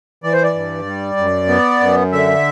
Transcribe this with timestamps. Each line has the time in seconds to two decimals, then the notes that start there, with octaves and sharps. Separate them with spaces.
0.23 E3 D5
0.33 C5
0.43 D5
0.54 G2
0.86 G3
1.17 F#2
1.49 B3
1.80 F#2
2.12 D3 E5